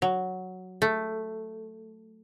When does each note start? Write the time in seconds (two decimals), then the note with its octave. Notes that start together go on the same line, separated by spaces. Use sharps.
0.02 F#3
0.82 A3